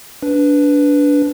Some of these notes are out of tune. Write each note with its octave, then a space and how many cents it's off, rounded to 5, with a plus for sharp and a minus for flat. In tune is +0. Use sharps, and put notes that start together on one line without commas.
D4 -20 B4 +0